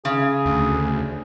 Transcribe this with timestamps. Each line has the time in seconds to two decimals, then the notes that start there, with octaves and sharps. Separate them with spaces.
0.05 C#3 G#4
0.46 D2